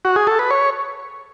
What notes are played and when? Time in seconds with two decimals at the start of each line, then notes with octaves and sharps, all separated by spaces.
0.05 F#4
0.16 G#4
0.27 A4
0.39 B4
0.51 C#5